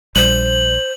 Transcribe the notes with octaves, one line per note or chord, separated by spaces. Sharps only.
A#1 G3 C5 F#7